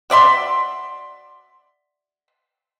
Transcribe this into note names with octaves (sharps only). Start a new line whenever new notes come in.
F#4 D5 E5 C6